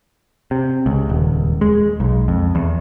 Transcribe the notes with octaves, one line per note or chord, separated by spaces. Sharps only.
C3
C#2
D#1
G#3
B1
F2
E2